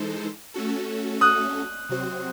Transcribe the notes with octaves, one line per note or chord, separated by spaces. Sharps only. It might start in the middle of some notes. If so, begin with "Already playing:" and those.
Already playing: E3 G#3 D#4 A4 C5
A3 C#4 F#4 A4
D#6 F#6
C3 F#3 C4 F#4 C5